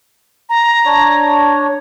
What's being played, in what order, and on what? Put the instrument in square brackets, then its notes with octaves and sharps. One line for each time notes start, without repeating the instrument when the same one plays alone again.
[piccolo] A#5
[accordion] D4 C#5